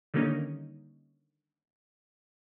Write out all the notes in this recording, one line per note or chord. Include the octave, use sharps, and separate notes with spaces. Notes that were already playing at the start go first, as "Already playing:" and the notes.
D3 D#3 G3 A#3 C#4 D#4